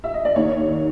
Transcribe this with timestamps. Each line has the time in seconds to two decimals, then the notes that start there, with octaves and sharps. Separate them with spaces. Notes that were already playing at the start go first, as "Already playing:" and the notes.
0.04 E5
0.14 D#5
0.25 D5
0.36 D#2 C#5
0.68 D#3